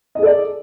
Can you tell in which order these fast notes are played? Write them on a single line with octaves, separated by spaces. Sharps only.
D#5 G#4 A4 D5